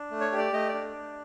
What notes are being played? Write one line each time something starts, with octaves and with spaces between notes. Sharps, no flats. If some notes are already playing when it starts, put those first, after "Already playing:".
Already playing: D4
A3
C#5
G4
D5
A3 D#5
D5
D4